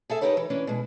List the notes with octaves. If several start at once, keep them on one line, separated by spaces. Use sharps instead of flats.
G#4 A4 E5
D#4 E4 G4 A#4 B4 C#5
E3
E3 C#4 D4
B2 G#3